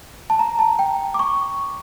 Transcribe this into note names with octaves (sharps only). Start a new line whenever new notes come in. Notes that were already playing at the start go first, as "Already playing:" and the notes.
A5
A#5
A5
G5
D6
C#6